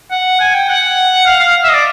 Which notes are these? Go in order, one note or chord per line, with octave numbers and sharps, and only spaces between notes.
F#5
G#5
G5
F#5
F5
F5
E5
D#5
D5